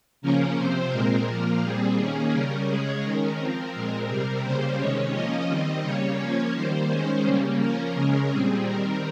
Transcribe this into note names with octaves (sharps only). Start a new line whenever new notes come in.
C#3 F3 A#3 C#4 A#4
C3 F3 C4 C5
A#2 G#3 C4 A#4
A#2 F3 A#3
A#2 G3 C4 G#4
D#3 A#3 C#4
C#3 G3 C#4 A#4
C#3 G#3 C#4 G#4
D#3 G#3 C#4 A#4
F3 C4
A#2 G#3 C4 A#4
C3 G3 C4 A#4
C#3 G3 A#3 C5
C3 D#3 G#3 C#4 C#5
F3 A#3 C#4 D#5
D#3 G3 C4
C#3 G3 A#3 C#5
F3 A#3 C#4
D#3 G3 A#3 C5
D#3 G#3 C#4
C#3 G3 A#3 C#4
F3 A#3 C#4 A#4
C#3 G#3 C#4
A#2 G3 C4 G#4
D#3 G3 C4 A#4